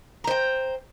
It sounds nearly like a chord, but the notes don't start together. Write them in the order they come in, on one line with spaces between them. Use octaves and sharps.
A#5 C5 G5